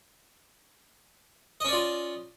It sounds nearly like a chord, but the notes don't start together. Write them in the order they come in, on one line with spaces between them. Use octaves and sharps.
D#5 C#4 D5 F4